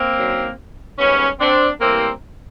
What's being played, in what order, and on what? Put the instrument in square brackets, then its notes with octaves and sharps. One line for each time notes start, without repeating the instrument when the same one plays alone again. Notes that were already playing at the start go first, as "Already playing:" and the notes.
Already playing: [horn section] A#3 C4
F#2 D#3 F#3
G#2 D#3 G3 B3 C#4
C4 D4
A2 E3 G3 A#3 C4